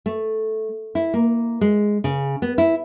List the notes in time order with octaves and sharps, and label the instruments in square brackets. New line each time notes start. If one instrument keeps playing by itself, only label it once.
[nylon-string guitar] A3
E4
A#3
G#3
C#3
B3
E4